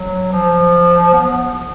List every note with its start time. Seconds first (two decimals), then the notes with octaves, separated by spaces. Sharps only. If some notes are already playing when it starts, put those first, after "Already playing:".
Already playing: F#3
0.33 F3
1.14 B3